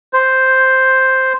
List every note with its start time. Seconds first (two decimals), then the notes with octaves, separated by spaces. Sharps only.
0.13 C5